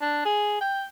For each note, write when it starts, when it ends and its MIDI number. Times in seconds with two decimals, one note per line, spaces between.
0.01 0.24 62
0.25 0.56 68
0.61 0.83 79